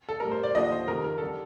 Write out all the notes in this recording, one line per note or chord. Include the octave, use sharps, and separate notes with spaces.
A4
A2 G3 A#4
C5
D5
D#2 D3 F3 D#5
C5
F2 C3 D#3 A#4
A#4
D3 G3 A4